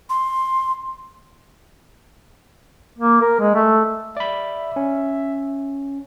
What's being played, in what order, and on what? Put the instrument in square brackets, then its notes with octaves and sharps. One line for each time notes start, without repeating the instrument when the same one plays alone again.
[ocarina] C6
[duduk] A#3
A#4
G#3
A3
[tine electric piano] D5 B5 [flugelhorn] E5
[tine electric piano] C#4